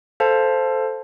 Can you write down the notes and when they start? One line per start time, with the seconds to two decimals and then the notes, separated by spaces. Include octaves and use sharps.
0.20 A4 C5 F5 A5